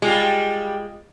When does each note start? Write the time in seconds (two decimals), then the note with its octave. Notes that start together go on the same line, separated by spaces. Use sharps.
0.02 G3 G#3 F4 G4